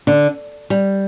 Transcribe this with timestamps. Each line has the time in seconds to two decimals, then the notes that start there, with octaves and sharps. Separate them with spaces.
0.07 D3
0.70 G3